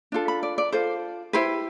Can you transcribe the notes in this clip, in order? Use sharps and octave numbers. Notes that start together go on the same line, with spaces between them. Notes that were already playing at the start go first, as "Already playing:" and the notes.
D4 F4 A4
B5
D5
D5
F4 A4 C5
E4 G4 B4 C5